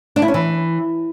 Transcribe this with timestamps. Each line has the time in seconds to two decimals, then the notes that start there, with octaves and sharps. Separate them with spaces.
0.16 D4
0.22 E4
0.28 C#4
0.34 E3